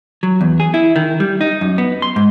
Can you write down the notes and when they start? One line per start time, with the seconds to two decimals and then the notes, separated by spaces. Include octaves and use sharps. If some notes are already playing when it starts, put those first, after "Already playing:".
0.23 F#3
0.41 E2
0.60 G#4
0.74 E4
0.96 D#3
1.20 G3
1.41 D#4
1.61 F#2
1.78 B3
2.02 C6
2.16 G#2